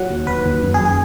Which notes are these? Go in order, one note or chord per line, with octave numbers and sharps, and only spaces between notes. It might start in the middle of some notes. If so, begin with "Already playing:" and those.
Already playing: F#3 F#5
D#2
D#2 B4
D#2
F#2
G#4
F#2
G#4